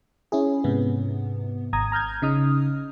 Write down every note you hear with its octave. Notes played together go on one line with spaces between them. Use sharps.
C#4 E4 G#4
G#2 C3 B3
G#1 A#5 D#6 G#6
A#5 F6 G6 G#6
C#3 D#4 D#6 F6